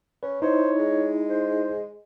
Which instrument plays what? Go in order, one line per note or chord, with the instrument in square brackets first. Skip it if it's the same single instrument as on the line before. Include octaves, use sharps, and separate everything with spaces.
[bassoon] C#4 [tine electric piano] B4
[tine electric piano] D#4 E4 [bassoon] C5 [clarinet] C#5
[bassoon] G#3
[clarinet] C5